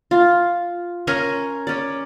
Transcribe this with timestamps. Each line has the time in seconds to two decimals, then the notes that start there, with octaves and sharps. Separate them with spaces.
0.11 F4
1.07 C#4 A#4 G#5 C6
1.67 C#4 D5